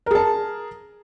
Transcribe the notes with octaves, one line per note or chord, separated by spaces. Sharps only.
G#4 A#4 A5